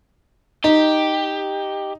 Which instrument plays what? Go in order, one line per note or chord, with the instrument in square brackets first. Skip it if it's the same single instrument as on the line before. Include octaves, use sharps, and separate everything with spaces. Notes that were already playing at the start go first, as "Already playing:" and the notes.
[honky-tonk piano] D#4 [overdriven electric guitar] G4